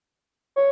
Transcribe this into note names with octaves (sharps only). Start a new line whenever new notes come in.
C#5